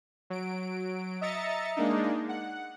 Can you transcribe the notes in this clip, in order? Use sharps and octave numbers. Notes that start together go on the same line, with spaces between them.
F#3 D7
D#5 E5 A#5 A6 C#7
G#3 A#3 D4 D#4
F#5